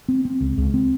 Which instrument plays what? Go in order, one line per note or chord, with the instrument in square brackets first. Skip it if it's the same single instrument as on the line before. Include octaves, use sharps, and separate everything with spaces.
[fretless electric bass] C4
C4
C#2
C#2
C4